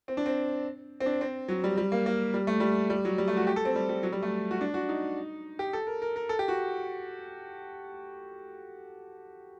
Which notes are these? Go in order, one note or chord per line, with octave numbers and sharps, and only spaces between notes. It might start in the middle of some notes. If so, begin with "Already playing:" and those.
C4
D4
C4
C4
D4
C4
F#3
G3
G3
A#3
A#3
G3
A3
G3
G3
F#3
G3
A3
F#4
G4
A4
C4
G3
G3
F#3
G3
A3
F#4
D4
F#4
D#4
G4
A4
A#4
A#4
A#4
A4
G4
F#4